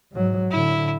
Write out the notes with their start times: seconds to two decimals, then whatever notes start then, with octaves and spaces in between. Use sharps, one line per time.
0.12 G#2 F#3
0.51 A2 D3 E4